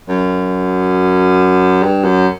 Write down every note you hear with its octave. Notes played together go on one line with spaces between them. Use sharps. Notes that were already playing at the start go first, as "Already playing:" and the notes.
F#2
G2
F#2